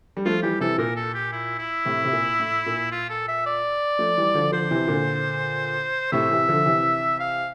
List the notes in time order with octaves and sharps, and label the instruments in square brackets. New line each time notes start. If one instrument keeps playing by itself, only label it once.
[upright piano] G3
[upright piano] F3 A3 [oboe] F4
[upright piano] E3 G3 [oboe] G4
[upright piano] C3 E3 [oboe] A4
[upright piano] A#2 [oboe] A#4
[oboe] A4
G4
E4
E4
[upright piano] A2 C3
C3
A#2
A2
A#2
[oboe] F4
A4
E5
D5
[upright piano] F3 A3
E3 G3
D3 F3
[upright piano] D3 F3 [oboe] C5
[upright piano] C3 E3
A#2 D3
[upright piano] A2 C3 [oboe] E5
[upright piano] C3 E3
D3 F3
C3 E3
[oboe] F5